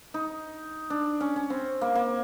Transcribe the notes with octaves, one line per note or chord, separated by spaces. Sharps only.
D#4
D4
C#4
C#4
C4
A#3
A#3